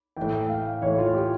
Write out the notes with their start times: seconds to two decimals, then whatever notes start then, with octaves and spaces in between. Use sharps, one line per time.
0.17 A2 E3 G5
0.49 F5
0.82 A2 E3 C#5
0.98 F4
1.14 G4